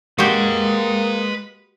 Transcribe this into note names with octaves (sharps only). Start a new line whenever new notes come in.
G#3 A#3 F#4 G4 B4 G5